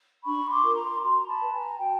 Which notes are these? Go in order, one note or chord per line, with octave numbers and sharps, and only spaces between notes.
D4 B5 C#6
C6 D6
F4 A#4
A#5 C6
F#4 A#5 C6
A5 B5
B4
G#5 A#5
F#4 G5 A5